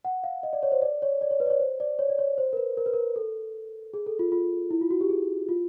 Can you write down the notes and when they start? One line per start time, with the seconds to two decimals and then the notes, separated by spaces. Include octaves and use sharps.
0.05 F#5
0.24 F5
0.43 D#5
0.53 D5
0.63 C#5
0.72 C5
0.82 D5
1.02 C#5
1.21 D5
1.31 C#5
1.40 B4
1.46 D5
1.50 C#5
1.60 C5
1.80 D5
1.99 C#5
2.09 D5
2.19 C#5
2.38 C5
2.53 A#4
2.57 B4
2.77 A#4
2.86 B4
2.93 A#4
3.16 A4
3.94 G#4
4.07 A4
4.19 F4
4.32 F4
4.71 E4
4.81 F4
4.91 F#4
5.01 G4
5.09 G#4
5.49 F4